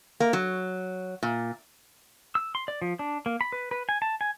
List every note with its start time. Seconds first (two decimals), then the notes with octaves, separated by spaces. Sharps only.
0.20 A#3
0.33 F#3
1.23 A#2
2.35 E6
2.55 C6
2.68 D5
2.82 F3
2.99 D4
3.26 A#3
3.41 B5
3.52 B4
3.71 B4
3.89 G#5
4.02 A5
4.21 G#5